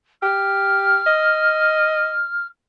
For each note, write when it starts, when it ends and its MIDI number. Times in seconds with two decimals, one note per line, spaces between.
0.23 1.00 67
0.23 2.47 89
1.07 2.23 75